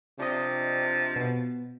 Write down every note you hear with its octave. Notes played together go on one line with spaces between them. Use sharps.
C3 F3 D4 D#5
B2